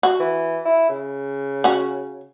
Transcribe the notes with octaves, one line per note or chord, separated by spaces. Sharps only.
F#4
E3
E4
C#3
C#4 F#4